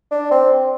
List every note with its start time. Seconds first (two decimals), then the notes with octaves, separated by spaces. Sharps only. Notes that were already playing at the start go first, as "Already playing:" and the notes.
0.11 D4
0.31 C4